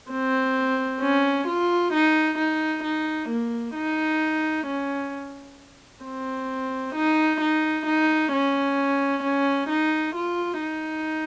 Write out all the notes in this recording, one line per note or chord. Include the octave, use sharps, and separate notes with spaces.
C4
C#4
F4
D#4
D#4
D#4
A#3
D#4
C#4
C4
D#4
D#4
D#4
C#4
C#4
D#4
F4
D#4